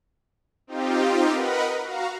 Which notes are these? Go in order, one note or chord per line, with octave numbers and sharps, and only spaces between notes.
C4 D#4 F4 G4
A#4 B4 D#5 F#5 B5
F#4 F5 A#5